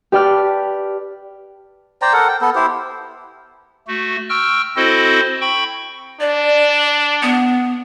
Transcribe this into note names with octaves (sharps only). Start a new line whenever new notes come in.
G4 B4 D5 G5 A5 F6
C5 D5 G5 A#5
A4 A#4 F#5
G5
B3 A4
E4 G4 C5
A3 F#4
G5 C#6 E6 F6
C4 E4 F#4 A4 C5 D#5
G5 B5 C#6
D4 D5
B3